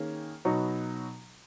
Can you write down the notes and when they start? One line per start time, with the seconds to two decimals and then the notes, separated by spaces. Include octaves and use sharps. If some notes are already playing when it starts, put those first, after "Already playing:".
Already playing: D#3 A#3 C#4 G#4
0.45 B2 F#3 B3 D#4 F#4